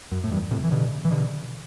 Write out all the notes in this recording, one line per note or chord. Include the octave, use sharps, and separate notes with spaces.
F#2
A2
E2 G2
A2 C3
E3
B2 D3
E3
B2 D3